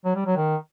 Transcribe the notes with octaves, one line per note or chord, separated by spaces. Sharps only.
F#3
G3
F#3
D#3